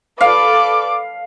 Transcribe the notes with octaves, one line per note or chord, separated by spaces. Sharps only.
A4 B4 D5 F5 D6